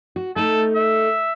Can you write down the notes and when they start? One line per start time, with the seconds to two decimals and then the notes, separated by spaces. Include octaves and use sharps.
0.16 F#4
0.36 A3 D#4 A4
0.75 E5